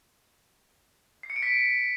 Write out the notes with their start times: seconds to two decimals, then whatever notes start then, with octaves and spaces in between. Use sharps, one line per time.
1.23 C7
1.30 C#7
1.36 D7
1.43 B6